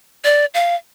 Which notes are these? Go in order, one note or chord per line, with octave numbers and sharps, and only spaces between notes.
D5
F5